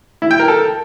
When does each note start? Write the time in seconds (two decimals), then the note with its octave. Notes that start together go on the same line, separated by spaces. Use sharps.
0.22 E4
0.31 G5
0.39 A#4
0.48 A4